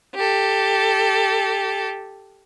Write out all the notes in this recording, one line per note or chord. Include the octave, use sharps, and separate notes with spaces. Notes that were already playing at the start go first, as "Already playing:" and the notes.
G4 A4